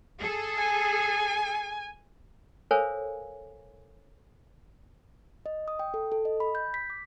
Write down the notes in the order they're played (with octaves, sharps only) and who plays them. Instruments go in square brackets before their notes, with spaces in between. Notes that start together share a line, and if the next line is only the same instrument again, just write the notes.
[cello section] G#4 A4
[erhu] G#5
[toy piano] A4 A#4 C5 C#5 F5 G#5
[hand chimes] D#5
D#6
G5
A4
A4
D#5
B5
G6
B6
D6